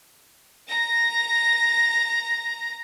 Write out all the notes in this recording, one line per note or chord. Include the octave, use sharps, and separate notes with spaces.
A#5 A#6